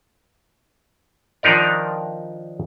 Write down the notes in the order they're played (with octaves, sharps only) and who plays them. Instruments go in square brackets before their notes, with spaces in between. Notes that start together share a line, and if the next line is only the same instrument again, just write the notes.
[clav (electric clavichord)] D#3 F3 D4 D#4 A#4 D5